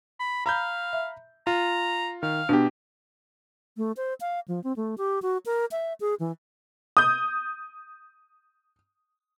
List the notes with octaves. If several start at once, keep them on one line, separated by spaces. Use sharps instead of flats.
B5
F5 A#5 B5 G6
E5
F4 A#5
D#3 F5
B2 B3 D4 G4
A3
C5
F5
F3
C4
A3
G4
F#4
A#4
E5
G#4
E3
D#6 G6